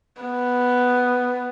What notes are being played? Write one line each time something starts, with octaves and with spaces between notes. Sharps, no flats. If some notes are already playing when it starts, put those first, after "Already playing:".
B3